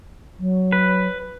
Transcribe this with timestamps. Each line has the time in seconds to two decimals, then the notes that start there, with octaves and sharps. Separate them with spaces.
0.39 F#3
0.72 B4